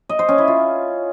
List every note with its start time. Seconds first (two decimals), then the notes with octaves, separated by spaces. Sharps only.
0.09 D#5
0.19 C5
0.29 C#4
0.38 E4
0.48 F4